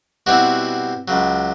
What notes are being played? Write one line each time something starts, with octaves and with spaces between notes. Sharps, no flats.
B2 G3 C4 E4 F#4
C#2 C#3 F#3